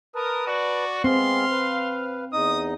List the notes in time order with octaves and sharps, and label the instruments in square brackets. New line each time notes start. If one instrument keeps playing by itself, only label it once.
[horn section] A#4 [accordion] B4 A5 [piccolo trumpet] D#6
[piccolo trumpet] F#4 [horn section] D5
[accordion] G#3 B3 [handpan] C4 [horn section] F5 [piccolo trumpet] C6
[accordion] B4
[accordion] E2 D#4 D#5 [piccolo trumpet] D#6